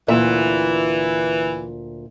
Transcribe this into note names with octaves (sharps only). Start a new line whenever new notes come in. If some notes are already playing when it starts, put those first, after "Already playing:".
D2 A#2 E3 E5